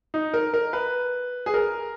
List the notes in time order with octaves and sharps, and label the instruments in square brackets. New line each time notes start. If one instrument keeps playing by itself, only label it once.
[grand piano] D#4
A#4
A#4
B4
G#4
A#4